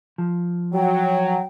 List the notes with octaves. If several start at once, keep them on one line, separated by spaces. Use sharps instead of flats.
F3
F#3 G5